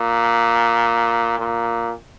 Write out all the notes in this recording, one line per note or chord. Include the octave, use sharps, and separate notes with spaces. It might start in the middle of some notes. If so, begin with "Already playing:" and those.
Already playing: A#2
A#2